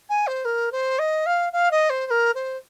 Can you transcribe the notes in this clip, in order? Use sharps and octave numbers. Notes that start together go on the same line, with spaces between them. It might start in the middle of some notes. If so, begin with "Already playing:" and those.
G#5
C5
A#4
C5
D#5
F5
F5
D#5
C5
C5
A#4
C5